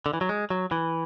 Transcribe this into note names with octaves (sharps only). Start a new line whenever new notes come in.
D3
E3
F#3
G#3
F#3
E3